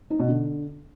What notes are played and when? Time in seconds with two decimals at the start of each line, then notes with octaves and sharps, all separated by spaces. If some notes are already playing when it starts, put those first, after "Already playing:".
0.10 D#4
0.19 B2
0.28 D3